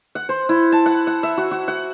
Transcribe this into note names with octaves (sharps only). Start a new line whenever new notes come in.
F#5
C5
E4
A5
F#5
F#5
E5
F#4
F#4
F#5